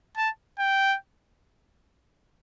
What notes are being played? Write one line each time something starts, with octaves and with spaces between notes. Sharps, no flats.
A5
G5